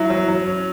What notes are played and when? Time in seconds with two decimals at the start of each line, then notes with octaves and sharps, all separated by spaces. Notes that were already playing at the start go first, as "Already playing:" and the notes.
Already playing: F#3 E4
0.10 F#3
0.29 F#3
0.46 C#4